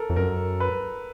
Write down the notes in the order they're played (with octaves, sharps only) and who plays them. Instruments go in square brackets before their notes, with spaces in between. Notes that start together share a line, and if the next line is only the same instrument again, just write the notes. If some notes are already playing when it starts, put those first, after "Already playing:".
Already playing: [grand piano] A4 A#4
[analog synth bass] F2
[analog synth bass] F#2 [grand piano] A#4
[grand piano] B4